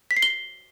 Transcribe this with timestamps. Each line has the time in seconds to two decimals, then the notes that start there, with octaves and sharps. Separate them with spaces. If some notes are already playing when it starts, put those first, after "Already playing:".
0.11 B6
0.17 C7
0.22 G7